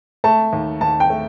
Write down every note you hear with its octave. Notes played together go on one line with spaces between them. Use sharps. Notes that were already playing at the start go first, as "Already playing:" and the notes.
A3 A5
D#2
D#2 A5
G5
A3